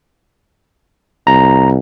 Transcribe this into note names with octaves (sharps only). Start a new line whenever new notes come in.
C2 A#5